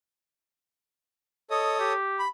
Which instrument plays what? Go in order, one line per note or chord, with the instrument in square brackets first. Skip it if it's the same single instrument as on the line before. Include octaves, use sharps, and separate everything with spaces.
[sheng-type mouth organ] A4 C#5 D#6 [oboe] D#5
[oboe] G4
[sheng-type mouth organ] B5